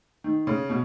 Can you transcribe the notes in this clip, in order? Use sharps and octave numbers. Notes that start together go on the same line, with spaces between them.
D#3
C#3
B2